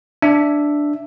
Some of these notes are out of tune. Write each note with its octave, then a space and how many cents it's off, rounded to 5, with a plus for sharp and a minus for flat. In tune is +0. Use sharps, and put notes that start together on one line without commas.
D4 +0 E5 +5